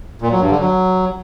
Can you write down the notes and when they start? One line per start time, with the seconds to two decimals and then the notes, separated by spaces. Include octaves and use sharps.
0.22 A#2
0.31 F#3
0.41 G2
0.51 D3
0.60 F#3